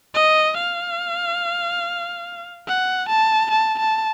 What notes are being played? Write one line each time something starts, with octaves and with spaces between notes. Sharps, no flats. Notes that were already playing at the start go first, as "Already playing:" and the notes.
D#5
F5
F#5
A5
A5
A5